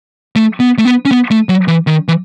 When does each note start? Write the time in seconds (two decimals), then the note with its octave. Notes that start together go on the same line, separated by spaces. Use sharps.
0.36 A3
0.60 B3
0.78 A3
0.85 B3
1.05 C#4
1.11 B3
1.31 A3
1.49 F#3
1.68 E3
1.87 D#3
2.08 E3